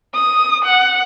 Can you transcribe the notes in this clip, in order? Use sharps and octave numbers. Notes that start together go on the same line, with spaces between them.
D#6
F#5